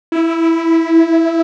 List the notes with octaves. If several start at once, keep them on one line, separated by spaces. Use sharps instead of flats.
E4